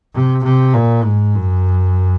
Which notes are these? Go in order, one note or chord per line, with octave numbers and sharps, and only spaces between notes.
C3
C3
A#2
G#2
F#2